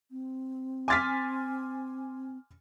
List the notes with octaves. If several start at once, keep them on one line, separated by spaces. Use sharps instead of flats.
C4
G#5 C6 D6 F6 A6 B6